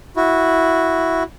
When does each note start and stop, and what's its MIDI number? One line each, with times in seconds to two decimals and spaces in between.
0.16 1.23 64
0.16 1.23 66